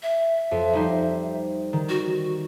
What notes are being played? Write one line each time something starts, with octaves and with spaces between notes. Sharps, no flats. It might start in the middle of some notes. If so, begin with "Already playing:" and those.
E5
F2
G3 D#4 C5
D#3
F#4